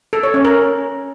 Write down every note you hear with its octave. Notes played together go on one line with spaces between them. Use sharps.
A4
C#5
C#4
A#4